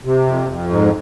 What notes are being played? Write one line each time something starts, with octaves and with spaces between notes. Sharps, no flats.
C3
F2
F2
G#2